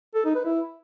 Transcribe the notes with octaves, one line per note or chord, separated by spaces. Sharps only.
A4
D#4
B4
E4